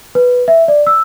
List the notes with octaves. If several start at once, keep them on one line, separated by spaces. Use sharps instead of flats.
B4
E5
D5
E6